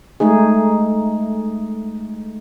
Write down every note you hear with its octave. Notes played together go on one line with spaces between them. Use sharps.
G#3 A3 D#4 G#4